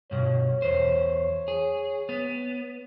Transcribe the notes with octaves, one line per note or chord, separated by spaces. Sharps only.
G2 B2 C#5
E2 C5
G#4
B3